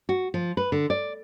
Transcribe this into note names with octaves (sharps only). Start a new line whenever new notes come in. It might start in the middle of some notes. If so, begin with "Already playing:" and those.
F#4
F3
B4
D3
D5